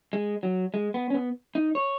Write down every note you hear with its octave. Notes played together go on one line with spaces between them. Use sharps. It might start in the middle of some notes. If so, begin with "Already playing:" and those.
G#3
F#3
G#3
B3
C#4
B3
D#4
C#5